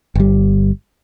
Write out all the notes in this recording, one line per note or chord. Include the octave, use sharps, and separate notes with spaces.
G1 G3